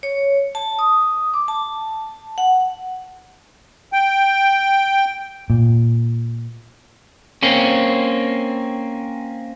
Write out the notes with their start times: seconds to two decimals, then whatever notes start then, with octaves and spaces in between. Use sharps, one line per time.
0.03 C#5
0.55 A5
0.79 D#6
1.34 D6
1.48 A5
2.38 F#5
3.93 G5
5.50 A#2
7.43 A#3 C4 C#4